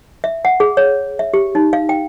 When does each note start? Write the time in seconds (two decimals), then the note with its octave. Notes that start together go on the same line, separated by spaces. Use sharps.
0.24 E5
0.45 F#5
0.60 G#4
0.77 C#5
1.19 E5
1.34 G4
1.55 D#4
1.73 F5
1.89 G5